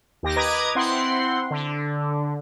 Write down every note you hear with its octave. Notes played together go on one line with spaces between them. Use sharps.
D#2 G4 A#6
B4 D#5 A#5 D6 D#6 G#6
C4 E4 F#5 C6
D3